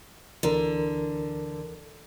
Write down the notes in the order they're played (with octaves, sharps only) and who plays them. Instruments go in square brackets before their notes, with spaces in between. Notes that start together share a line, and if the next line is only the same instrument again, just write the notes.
[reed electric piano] D2 E3 A#4 [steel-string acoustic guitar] D3